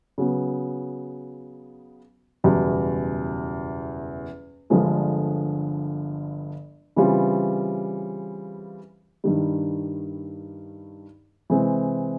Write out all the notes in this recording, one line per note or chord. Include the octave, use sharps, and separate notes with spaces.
C#3 F#3 B3
F#1 E2 B2 G3
G1 G2 D3 F3 G#3
C#3 E3 G3 C4 F4
G2 D#3 G3
C3 E3 G#3 C4